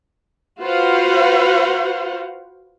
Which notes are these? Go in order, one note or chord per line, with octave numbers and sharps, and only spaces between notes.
F4 F#4 B4 C5 F5 F#5